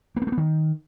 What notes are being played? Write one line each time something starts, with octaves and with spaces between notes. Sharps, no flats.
A#3
B3
A3
B3
D#3